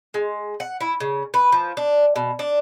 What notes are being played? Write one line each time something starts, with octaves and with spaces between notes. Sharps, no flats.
G#3
F#5
E4
C#3
B4
F3
D4
B2
D4